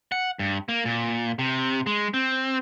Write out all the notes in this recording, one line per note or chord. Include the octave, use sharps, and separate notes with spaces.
F#5
G2
A#3
A#2
C3
G#3
C4